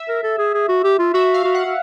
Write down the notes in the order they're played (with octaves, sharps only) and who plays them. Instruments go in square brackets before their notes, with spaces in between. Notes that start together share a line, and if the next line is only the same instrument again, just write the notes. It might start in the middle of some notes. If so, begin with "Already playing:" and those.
Already playing: [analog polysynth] E5
[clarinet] A#4
A4
G#4
G#4
F#4
G4
F4
[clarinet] F#4 [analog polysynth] E5
[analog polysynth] F5
[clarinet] F#4
[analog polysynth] F#5
[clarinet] F#4